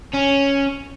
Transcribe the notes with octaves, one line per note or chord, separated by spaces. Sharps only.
C#4